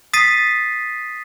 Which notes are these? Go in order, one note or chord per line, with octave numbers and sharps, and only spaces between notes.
D#6 A6 B6 C7 D#7